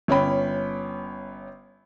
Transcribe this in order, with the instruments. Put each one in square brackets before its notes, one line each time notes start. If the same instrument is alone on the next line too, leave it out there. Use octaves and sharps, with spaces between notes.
[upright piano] G1 C#4 G5 B5